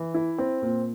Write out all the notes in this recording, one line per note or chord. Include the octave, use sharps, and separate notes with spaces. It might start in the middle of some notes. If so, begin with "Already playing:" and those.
Already playing: E3
E4
C4
A#2